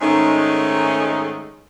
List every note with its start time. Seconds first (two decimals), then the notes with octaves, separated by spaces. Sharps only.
0.01 G#2 D#3 G#3 A3 C#4 D#4